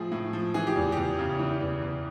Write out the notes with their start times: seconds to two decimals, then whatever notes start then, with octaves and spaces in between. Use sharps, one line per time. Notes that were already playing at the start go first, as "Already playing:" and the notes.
Already playing: A2 F3 G#4
0.12 A2
0.33 F3
0.54 E3 G#4
0.67 G4
0.76 E2
0.92 E2 G4
1.19 C#3
1.39 E3
1.61 E2
1.82 E2